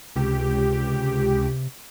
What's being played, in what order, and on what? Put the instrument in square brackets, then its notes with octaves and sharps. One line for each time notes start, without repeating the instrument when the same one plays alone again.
[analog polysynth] C#2 G4 [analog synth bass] C3